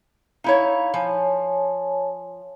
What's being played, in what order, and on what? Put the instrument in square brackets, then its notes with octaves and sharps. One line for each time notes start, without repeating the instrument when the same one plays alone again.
[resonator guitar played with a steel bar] D#4 E4 C#5 [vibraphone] F5
[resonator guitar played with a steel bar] F3 [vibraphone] C#5 G#5 A5